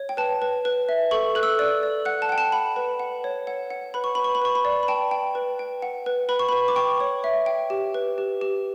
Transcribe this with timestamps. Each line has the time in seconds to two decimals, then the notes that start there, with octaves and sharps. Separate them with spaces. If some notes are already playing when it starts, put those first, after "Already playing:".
Already playing: C#5
0.09 G5
0.17 B4 A5
0.42 B4
0.65 B4
0.89 E5
1.11 A4 C#6
1.35 A4 F#6
1.43 E6
1.59 D5
1.83 D5
2.05 F#5 F#6
2.22 A5
2.29 F#5 G5
2.38 A5
2.52 F#5 B5
2.76 B4
2.99 F#5
3.24 C#5
3.47 F#5
3.70 F#5
3.94 B4 B5
4.04 C#6
4.15 B4 B5
4.24 C#6
4.35 B5
4.42 B4 C#6
4.55 B5
4.65 D5
4.83 B5
4.88 G5 A5
5.11 G5
5.35 B4
5.59 G5
5.82 F#5
6.06 B4
6.29 B4 B5
6.39 C#6
6.49 B4 B5
6.68 D6
6.76 G5 C#6
7.00 C#5
7.24 E5
7.46 G5
7.70 G4
7.94 B4
8.18 G4
8.41 G4